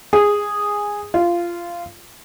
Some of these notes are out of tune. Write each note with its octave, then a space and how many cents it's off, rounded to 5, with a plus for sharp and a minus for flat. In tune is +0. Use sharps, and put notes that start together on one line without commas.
G#4 -10
F4 -15